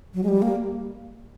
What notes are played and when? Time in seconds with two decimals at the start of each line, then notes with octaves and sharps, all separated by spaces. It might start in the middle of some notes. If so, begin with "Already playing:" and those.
0.14 F#3
0.23 G#3
0.28 G3
0.42 A#3